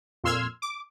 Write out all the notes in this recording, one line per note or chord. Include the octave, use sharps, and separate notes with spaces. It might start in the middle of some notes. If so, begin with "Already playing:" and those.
F2 A#2 C6 E6 F6 G#6
D6